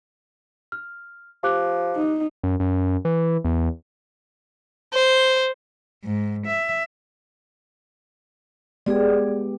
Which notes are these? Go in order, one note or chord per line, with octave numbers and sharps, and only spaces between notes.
F6
F3 G4 D6 F#6
D#4
F#2
F#2
E3
E2
C5
G#2
E5
G#3 B3 G4 G#4 D5